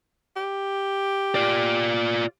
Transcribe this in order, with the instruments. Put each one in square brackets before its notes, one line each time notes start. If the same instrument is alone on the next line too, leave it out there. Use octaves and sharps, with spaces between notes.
[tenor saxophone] G4
[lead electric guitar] F4 D5